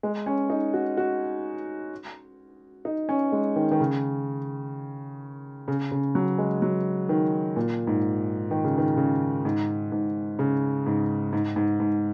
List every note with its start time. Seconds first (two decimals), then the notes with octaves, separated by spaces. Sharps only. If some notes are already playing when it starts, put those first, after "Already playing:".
0.03 G#3
0.26 C#4
0.50 D#4
0.74 F#4
0.97 F#4
2.85 D#4
3.09 C#4
3.32 G#3
3.56 D#3
3.71 D#3
3.80 C#3
5.68 C#3
5.91 C#3
6.15 F#3
6.38 G#3
6.62 F#3
7.09 D#3
7.56 A#2
7.87 G#2
8.51 D#3
8.64 C#3
8.78 D#3
8.97 C#3
9.45 G#2
9.92 G#2
10.39 C#3
10.86 G#2
11.33 G#2
11.56 G#2
11.80 G#2